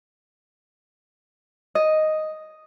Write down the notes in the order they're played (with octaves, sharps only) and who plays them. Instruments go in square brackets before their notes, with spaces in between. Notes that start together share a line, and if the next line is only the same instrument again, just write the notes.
[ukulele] D#5